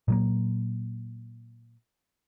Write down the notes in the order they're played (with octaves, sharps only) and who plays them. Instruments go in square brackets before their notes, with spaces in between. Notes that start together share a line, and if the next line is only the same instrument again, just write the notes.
[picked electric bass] A#2 F#3 A#3